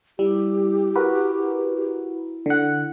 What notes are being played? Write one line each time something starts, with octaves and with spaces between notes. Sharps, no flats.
G3 E4 G4
F#4 A#4 B4
D3 F#5